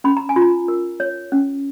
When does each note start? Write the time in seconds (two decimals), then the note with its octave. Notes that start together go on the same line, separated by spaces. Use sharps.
0.04 C#4 B5
0.17 A#5
0.29 G#5
0.36 F4
0.42 A#5
0.68 A#4
1.00 C#5
1.32 C#4